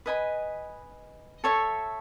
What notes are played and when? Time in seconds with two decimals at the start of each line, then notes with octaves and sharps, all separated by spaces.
0.06 B4 D#5 G#5 B5
1.44 A4 C#5 E5